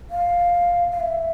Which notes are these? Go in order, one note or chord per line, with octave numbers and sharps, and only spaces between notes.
F5
F5
E5